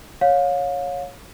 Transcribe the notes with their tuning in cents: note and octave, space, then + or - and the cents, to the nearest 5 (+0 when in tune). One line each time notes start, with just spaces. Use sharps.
C#5 +0 F5 +30